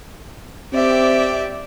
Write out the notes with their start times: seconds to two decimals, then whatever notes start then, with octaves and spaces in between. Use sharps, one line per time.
0.73 C4 G4 D5 E5